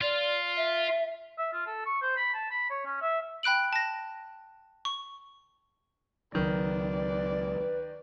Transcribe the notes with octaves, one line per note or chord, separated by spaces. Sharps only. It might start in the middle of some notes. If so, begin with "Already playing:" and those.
F4 D5
E5
E5
F4
A4
C#6
C5
B5
A5
B5
C#5
C#4
E5
G5 B5 F#6 D7 F#7
A5 A#6
C#6
C#2 D#3 F#3 B4 D5